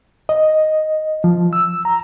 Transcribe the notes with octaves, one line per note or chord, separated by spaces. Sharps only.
D#5
F3
E6
A#5